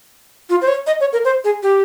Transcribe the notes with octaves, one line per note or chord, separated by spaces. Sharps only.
F4
C5
C#5
D#5
C#5
A#4
C5
G#4
G4